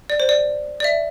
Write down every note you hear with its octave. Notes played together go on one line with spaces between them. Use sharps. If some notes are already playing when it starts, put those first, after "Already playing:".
D5
C5
D5
D5
E5